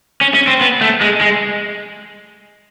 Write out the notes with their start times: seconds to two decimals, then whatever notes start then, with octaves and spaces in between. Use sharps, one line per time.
0.21 C#4
0.34 C#4
0.47 C4
0.61 B3
0.81 A3
1.01 G#3
1.21 G#3